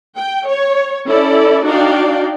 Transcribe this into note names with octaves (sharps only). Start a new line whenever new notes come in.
G5
C#5
C#4 E4 A4 D5
D4 D#4 F#4 D5 F5 G5